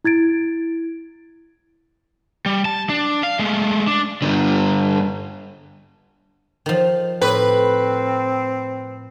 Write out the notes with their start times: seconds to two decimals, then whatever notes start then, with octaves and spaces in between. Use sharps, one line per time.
0.05 E4 G#6 A6 D7
2.46 G3
2.65 A5
2.89 D4
3.23 F5
3.39 G#3 A3
3.88 D4
4.22 G2 D3
6.66 D#3 F3
7.22 A2 C4 B4